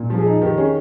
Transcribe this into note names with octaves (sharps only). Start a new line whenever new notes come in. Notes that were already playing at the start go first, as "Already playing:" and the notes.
Already playing: A#2
F3
G#4
D#4
D#3 G4
C#4 G#4